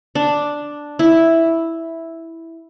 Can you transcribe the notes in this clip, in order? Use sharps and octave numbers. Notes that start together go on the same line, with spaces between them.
D4
E4